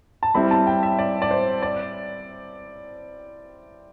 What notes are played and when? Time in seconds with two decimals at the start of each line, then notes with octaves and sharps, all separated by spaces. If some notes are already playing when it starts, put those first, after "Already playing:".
0.23 A5
0.34 G3 C4 E4 B5
0.51 A5
0.67 G5
0.83 E5
0.99 D5
1.22 D5
1.31 C5
1.62 D5